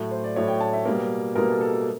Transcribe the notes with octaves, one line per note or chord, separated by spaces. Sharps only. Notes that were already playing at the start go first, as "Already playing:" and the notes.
Already playing: A2 F#3 A3
C5
D5
A2 F#3 A3 C#5
G5
A5
E5
B2 G3 A#3
B2 G3 A#3 A#4
A4
A4
A4